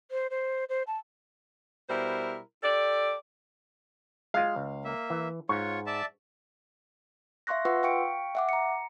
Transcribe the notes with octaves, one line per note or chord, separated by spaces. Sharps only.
C5
C5
C5
A5
B2 G3 E4 A#4 C5
G4 A4 D5
G#3 F4 F5
C#2
A#3 E5
E3
G#2 F4 C#5 C#6
D5 E5 A5
E5 F5 C6 C#6 F#6 A#6
F4 B4 F#5 C6 C#6 E6
F5 G5 C#6 C#7 D7
E5 F#5 D6
A#5 C#7